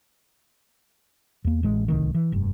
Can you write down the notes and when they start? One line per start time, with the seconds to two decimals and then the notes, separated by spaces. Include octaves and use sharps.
1.45 E2 A#3
1.63 A1 G#3
1.88 D1 C2 A2 D#3
2.14 E3
2.32 F1 G2